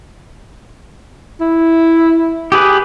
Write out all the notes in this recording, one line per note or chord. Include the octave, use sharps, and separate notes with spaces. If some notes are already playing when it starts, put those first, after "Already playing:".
E4
G4 G#4 B4